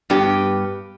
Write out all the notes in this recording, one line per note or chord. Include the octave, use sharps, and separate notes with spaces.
G2 B3 G4